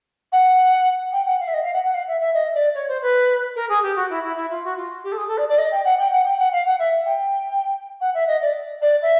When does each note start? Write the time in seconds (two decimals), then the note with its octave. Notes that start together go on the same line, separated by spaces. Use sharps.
0.32 F#5
1.12 G5
1.26 F#5
1.40 F5
1.47 E5
1.53 D#5
1.63 F5
1.73 F#5
1.84 F#5
1.94 F5
2.07 E5
2.21 E5
2.34 D#5
2.54 D5
2.75 C#5
2.88 C5
3.02 B4
3.56 A#4
3.69 G#4
3.82 G4
3.96 F#4
4.10 E4
4.23 E4
4.36 E4
4.50 F4
4.64 F#4
4.77 F4
5.04 G4
5.12 A4
5.17 G#4
5.28 A4
5.37 D5
5.48 D5
5.58 D#5
5.72 G5
5.84 F#5
5.99 G5
6.12 F#5
6.25 G5
6.39 F#5
6.52 F5
6.66 F#5
6.79 E5
7.06 G5
8.00 F#5
8.14 E5
8.27 D#5
8.41 D5
8.82 D5
9.02 E5